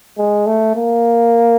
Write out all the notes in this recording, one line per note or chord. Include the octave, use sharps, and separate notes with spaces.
G#3
A3
A#3